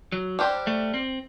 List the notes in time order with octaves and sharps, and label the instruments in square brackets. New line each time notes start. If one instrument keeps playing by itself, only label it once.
[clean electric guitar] F#3
[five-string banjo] G3 D4 G4 C5
[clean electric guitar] A3
C4